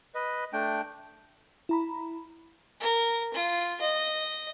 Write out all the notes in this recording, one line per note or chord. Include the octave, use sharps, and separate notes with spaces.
B4 D#5
A3 D4 G5
E4 A#5 B5
A#4
F4
D#5